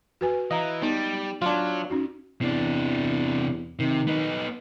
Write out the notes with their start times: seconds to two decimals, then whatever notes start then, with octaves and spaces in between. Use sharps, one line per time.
0.21 F#4 B4 G#5
0.51 E3 D#5 F5 A#5
0.82 G3 B3 D#4
1.42 F#3 D4 F4
1.90 C#4 D#4 F#4
2.41 E2 C3 D4
3.79 C3 D#3
4.07 B3 D#4